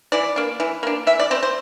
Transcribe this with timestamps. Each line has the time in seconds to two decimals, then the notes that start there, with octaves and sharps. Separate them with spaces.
0.12 E3 D5
0.36 A#3 D4
0.60 E3
0.83 A#3 D4
1.07 E3 E5
1.20 D5
1.31 C4 C5
1.35 A3
1.43 C5